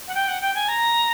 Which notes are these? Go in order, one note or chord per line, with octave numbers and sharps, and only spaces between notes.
F#5
G5
F#5
G5
G#5
A#5